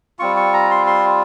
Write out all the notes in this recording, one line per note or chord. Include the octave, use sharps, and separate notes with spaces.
G3 C4 F4 C#6
C#6
A#5
C6
C6